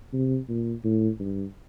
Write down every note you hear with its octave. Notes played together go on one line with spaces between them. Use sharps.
C3
A#2
A2
G2